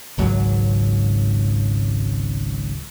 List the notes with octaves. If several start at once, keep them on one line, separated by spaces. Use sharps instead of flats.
G#1 C#2 G#2 F#3